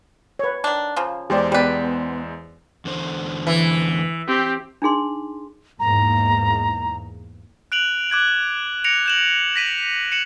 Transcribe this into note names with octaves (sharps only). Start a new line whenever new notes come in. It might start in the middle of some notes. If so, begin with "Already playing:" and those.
B4 C#5
D#3 D4
C#3 F3 A#3
E2 G#3 G4 C5 D5
G3 B3 G4 B4 D5 G5
E2 D3 C5
E3
C4 G4
D4 D#4 G#4 C6
E2 G#2 A#3 A#5
F#6 D7 F7 F#7
D6 F#6 G#6 F7
A#6 C#7 D7 F7
G6 E7 F#7
A#6 B6 D#7 F#7
C#7 D#7 E7 F#7